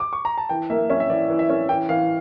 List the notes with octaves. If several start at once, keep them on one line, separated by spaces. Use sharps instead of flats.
D6
C#6
A#5
A5
E3 G5
A#3 E5
C#4 E5
E5
E3 D5
E3
E5
C#4
E3 G5
E3 F5